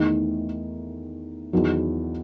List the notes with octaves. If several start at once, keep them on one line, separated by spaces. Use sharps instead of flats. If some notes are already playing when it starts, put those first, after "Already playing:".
Already playing: E2 D#3 A3 D#4
E2 D#3 F#3